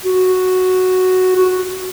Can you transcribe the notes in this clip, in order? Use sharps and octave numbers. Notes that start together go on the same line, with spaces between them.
F#4
F#4